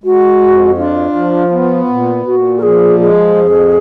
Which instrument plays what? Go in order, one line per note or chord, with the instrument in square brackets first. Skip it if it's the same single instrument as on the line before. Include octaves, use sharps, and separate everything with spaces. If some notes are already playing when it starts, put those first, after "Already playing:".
[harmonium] G#3 [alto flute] F#4
[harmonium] F2
[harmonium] D4 [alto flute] F4
[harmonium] F3
B3
A#2
[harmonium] A#2 [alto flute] F#4
[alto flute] A#4
[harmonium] F3 [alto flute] G#4
[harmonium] G#3 [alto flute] G#4
[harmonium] F2